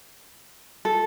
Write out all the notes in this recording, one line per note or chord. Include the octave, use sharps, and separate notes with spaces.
A4